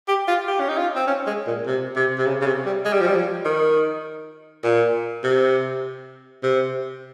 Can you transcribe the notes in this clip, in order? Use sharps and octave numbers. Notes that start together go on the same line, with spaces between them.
G4
F4
G4
C#4
D#4
F4
C4
C#4
G#3
A#2
C3
C3
C3
C#3
C#3
C3
G3
G#3
G3
F3
G3
F3
D#3
A#2
C3
C3